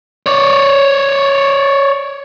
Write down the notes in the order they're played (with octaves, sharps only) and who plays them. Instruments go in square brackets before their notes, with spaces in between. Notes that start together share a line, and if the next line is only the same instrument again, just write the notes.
[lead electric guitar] C#5 D5